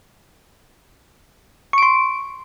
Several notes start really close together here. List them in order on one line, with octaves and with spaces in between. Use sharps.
C#6 D7 C6